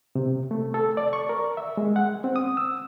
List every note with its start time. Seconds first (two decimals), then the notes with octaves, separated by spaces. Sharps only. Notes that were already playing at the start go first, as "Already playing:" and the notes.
0.15 C3
0.51 A3
0.74 A4
0.97 D5
1.13 C#6
1.29 A#4
1.57 E5
1.77 G#3
1.96 F#5
2.24 C4
2.36 D#6
2.57 E6